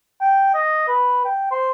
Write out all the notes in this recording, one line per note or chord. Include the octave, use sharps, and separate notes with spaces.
G5
D#5
B4
G5
C5